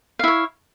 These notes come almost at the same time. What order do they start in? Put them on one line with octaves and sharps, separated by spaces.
F5 E4 C#5